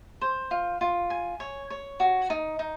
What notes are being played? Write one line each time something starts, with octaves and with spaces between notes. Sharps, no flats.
C5
F4
F4
G#5
C#5
C#5
F#4
D#4
D#4